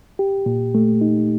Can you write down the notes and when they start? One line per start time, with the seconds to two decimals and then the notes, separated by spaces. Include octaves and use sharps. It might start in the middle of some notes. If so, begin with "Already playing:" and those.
0.19 G4
0.46 A#2
0.75 A3
1.01 D#4